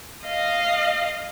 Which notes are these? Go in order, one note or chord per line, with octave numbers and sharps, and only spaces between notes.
D#5 F5